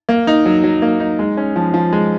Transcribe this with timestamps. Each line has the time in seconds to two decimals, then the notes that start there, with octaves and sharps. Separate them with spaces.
0.09 A#3
0.27 D#4
0.45 F#3
0.64 F#3
0.82 A#3
1.00 D#4
1.19 G#3
1.37 C#4
1.56 F3
1.74 F3
1.93 G#3